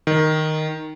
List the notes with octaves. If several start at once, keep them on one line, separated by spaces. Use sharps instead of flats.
D#3